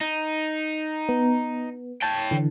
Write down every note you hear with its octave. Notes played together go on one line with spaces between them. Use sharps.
D#4
B3
C#5 G5 A5
D3 E3